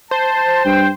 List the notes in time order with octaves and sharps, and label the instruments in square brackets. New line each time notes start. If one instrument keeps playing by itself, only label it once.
[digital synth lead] C5 [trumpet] A5
[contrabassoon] G2 [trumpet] G5